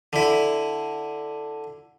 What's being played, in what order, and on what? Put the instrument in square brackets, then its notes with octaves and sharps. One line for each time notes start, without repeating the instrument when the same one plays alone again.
[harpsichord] D3 E4